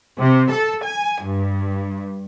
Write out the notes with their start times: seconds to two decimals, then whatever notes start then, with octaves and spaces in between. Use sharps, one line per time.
0.19 C3
0.52 A4
0.85 G#5
1.25 G2